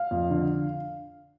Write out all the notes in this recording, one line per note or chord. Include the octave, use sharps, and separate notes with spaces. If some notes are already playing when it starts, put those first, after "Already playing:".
Already playing: F5
F2
D3